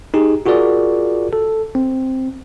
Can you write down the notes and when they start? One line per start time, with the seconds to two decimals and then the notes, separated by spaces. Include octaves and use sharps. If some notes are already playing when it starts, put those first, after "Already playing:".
0.14 D#4 G4 G#4
0.46 F4 F#4 G#4 A#4 D5
1.33 A4
1.75 C4